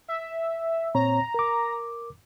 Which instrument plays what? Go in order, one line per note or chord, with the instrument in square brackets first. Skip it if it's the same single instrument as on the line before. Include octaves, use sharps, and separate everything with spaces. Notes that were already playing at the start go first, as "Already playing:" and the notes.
[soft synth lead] E5
[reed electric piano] A#2 C4 C#5 [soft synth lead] A#5
[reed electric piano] A#4 D6